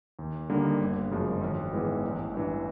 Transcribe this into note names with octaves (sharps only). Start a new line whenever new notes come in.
D#2
D3 G3 A#3 D#4
G1
F#2 C#3 F3 G#3
G#1
G#2 E3 G#3 B3
A1
G2 E3